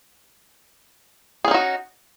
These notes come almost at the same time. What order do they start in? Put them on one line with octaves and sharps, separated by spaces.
G#4 C#4 D#4 F#4